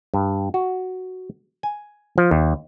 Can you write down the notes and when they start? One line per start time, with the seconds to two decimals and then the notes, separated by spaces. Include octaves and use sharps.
0.14 G2
0.54 F#4
1.63 G#5
2.18 F3
2.31 D#2